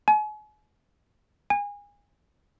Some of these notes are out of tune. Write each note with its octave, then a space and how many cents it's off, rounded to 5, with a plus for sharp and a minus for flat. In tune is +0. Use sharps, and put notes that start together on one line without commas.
G#5 +40
G#5 -30